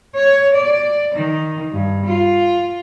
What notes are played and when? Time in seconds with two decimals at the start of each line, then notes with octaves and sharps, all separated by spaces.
0.15 C#5
0.55 D5
1.15 D#3
1.72 G2
2.06 F4